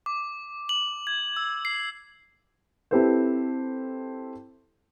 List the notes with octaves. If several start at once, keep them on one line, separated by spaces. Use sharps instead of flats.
D6
F#7
G#6
E6
C7
C4 E4 G4 A4 B4 C5